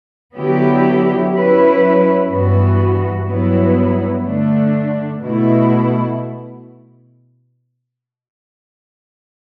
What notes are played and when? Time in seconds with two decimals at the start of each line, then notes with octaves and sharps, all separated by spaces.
0.36 D3 F#3 B3 E4 G4
1.33 F#3 C#4 E4 B4
2.29 G2 E3 B3 F#4
3.26 G2 F#3 B3 E4
4.24 D3 A3 D4
5.20 B2 A3 E4